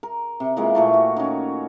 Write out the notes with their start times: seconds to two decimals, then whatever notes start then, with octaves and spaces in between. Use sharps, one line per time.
0.03 A#4
0.40 C3
0.57 E3 G#3 A#3 F4
0.75 A#2 E3 A3
0.94 F#4
1.17 D#3 C#4